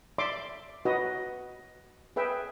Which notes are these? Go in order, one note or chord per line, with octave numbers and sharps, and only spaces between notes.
D5 E5 C6 D6
F#4 B4 D#5
G#4 B4 E5 G5